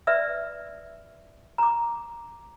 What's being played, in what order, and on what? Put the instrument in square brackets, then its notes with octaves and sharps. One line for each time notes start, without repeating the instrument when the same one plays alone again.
[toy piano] B4 D5 E5 E6
A#5 D6